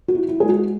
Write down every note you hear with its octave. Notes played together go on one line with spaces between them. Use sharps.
F#4
E4
E4
G#3 G#4
F#4